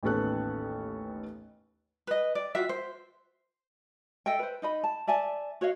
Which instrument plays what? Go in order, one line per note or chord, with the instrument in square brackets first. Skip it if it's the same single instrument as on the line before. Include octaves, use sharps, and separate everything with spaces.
[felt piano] A1 D#2 B3 C#4 A4 F#6
[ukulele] B4 D#5
D5
F4 F#4 E5
C5
A4 D#5 E5 G5
B4 C5
D#4 D#5 B5
A5
D5 E5 G#5 A5
F#4 C#5 D#5 F5